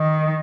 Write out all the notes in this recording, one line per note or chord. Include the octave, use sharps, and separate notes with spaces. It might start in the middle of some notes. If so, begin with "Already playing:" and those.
Already playing: D#3